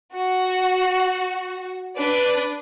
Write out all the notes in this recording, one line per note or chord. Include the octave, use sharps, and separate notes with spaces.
F#4
D4 B4 D5